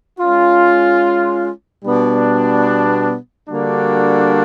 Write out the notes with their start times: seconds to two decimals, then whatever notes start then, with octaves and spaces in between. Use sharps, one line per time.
0.18 G#3 C#4 F4
1.83 B2 G3 B3 D4
3.48 D3 G3 A#3 D4 F#4